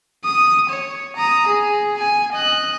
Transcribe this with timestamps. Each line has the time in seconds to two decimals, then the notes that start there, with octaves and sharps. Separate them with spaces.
0.24 D#6
0.70 C#5
1.16 A#5 D#6
1.47 G#4
1.97 G#5
2.33 D#5 F#6